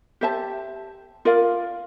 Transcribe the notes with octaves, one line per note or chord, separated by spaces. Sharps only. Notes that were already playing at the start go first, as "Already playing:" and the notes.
G4 C5 E5 A5
F4 A#4 D5 F5